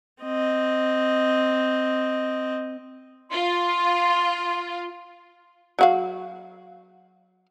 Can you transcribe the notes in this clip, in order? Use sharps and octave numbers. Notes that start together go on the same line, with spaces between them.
C4 D#5
F4 C6
F#3 F#4 F5